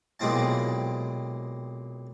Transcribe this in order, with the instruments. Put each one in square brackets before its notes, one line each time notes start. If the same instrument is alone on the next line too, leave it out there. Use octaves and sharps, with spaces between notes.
[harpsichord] B1 A#2 G#3 C4 E4 A5